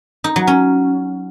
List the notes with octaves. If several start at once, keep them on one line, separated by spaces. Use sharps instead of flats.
D#4
F#3
C#4